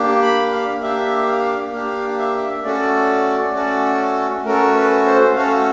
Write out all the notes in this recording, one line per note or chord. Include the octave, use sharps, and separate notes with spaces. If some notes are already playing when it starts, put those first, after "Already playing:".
Already playing: A#3 D4 G4
B5
F5
A#3 D4 G4 E5
F5
A#3 D4 G4 F5
E5
A3 C#4 F#4 A4 D5
A3 C#4 F#4 A4
A3 C#4 F#4 A4 A#4
B4
C5
A3 C#4 F#4 A4 F5